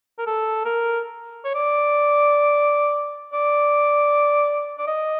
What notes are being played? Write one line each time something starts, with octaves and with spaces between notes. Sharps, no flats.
A#4
A4
A#4
C#5
D5
D5
D5
D#5